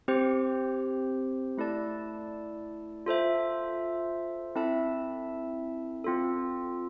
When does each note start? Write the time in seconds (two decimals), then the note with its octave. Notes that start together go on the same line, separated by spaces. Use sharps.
0.08 C4 G4 C5
1.57 A3 E4 A4 D5 A5
3.06 F4 A4 C5 E5
4.55 C4 E4 A4 E5 A5
6.04 C4 F4 A4